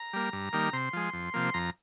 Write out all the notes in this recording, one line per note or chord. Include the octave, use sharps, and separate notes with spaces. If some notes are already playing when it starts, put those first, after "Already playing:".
Already playing: A#5
G3 A#3
G2
D#3 G3 A#3
C3 C6
F3 G#3
F2
C3 F3 A#3
F2 A#5